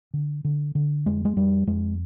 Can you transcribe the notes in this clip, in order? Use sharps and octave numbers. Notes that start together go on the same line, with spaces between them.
D3
D3
D3
F2 G#3
G#3
F2 G3
F2 G#3